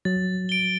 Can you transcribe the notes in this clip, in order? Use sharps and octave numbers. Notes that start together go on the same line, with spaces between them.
F#3 A6
D7 G7